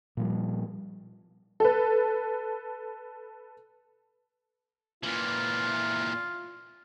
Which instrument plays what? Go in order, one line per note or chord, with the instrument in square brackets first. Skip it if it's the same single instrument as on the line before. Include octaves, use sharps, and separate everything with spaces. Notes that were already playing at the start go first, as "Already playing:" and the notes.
[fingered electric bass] A#2 F3 G3
[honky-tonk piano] A4 B4
[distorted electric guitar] A#2 E3 [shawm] F4